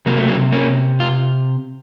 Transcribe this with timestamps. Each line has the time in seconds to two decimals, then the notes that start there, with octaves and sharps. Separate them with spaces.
0.06 C3 F#3 A#3
0.18 A3
0.28 F#3 A#3
0.52 A#3 C#4
1.00 F4